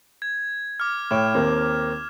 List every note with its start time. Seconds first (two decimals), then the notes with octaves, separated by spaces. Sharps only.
0.22 G#6
0.80 D6 F6
1.11 A2 C#5 G5 E7
1.34 D#2 A#3 C4